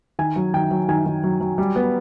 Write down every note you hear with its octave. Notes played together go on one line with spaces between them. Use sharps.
D#3 G#5
F#3
D#3 G5
F#3
D#3 G#5
D#3
F#3
F#3
G3
B3